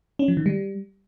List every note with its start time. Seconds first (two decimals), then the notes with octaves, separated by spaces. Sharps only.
0.19 C#4
0.28 F3
0.37 D#3
0.46 G3